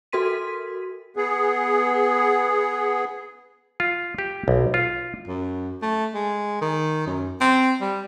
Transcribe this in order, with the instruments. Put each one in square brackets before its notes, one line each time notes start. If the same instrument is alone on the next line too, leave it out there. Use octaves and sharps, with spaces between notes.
[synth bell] F#4 A4 A#4 C6 B6 D#7
[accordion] B3 G#4
[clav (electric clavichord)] F4
G4
B1
F4
[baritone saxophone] F#2
A3
G#3
D#3
F#2
C4
G3